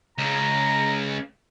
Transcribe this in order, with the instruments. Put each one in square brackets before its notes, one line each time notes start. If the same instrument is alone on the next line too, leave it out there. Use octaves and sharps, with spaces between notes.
[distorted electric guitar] C#2 C#3 [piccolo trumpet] A#5